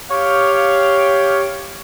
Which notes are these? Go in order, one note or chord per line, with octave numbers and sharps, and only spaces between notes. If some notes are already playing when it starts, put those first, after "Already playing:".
G4 C#5 F5